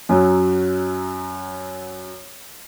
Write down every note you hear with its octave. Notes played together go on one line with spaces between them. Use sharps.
F#2 F#3